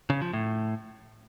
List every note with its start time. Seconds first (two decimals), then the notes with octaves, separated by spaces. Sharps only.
0.10 C#3
0.22 F3
0.33 A2